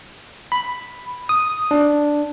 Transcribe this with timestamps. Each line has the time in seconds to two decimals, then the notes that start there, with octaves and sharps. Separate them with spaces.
0.52 B5
1.29 D#6
1.71 D4